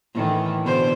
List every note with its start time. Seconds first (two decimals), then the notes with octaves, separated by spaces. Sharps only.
0.14 A2 D#3 E3
0.64 B2 D3 C5